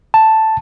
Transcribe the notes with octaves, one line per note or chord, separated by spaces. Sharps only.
A5